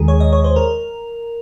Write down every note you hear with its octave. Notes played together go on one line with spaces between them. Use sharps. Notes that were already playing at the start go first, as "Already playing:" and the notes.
Already playing: D#2 D#3 G#3 G#4
C#5
D#5
C#5
C5
A#4